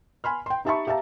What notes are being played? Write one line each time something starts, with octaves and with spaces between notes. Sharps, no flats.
G#5 B5 C6 F6
G5 C6
D#4 G4 E5 A5 B5 C#6
G4 E5 F5 A5 A#5